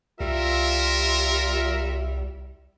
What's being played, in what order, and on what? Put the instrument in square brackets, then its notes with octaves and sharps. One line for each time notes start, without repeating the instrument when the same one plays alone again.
[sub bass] C2 [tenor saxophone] G3 [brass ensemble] F4 E5 [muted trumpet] A#4